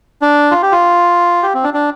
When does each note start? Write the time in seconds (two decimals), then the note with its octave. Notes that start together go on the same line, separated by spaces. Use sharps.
0.22 D4
0.51 F4
0.62 G4
0.72 F4
1.43 G4
1.54 C4
1.64 D4
1.74 D4